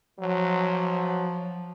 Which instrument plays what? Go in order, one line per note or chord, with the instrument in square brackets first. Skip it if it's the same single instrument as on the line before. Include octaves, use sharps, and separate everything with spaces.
[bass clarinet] F3 [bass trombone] F#3